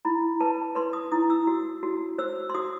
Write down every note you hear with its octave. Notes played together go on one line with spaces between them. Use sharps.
E4 B5
B4 A5
B4 C6
D#6
E4 D#6
E6
F#4
F#4
C5 E6
C6
F#4 D#6